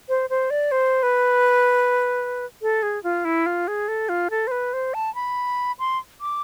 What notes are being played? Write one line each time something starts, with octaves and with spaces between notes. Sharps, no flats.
C5
C5
D5
C5
B4
A4
G#4
F4
E4
F4
G#4
A4
F4
A4
C5
B4
C5
A5
B5
C6
D6